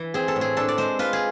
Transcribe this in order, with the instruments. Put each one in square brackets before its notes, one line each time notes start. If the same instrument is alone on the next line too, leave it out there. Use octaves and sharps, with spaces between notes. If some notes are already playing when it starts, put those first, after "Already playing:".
Already playing: [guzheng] E3
C4 G#4
A4
A2
G#4
D4 A4
D5
G#3 C5
F4 B4
G#4